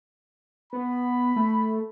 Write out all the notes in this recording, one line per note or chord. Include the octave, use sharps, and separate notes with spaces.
B3 B5
A3